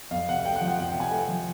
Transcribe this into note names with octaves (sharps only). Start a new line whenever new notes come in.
F2 F5
C3 F#5
A3 G5
F#5
F3
F#5
F2 F#5
G5
C3
G#5
A3
F3